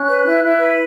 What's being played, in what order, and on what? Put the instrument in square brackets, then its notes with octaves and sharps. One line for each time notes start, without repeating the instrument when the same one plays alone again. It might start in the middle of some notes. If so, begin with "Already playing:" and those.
Already playing: [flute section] C#4 F#6
B4
E4
E4
B4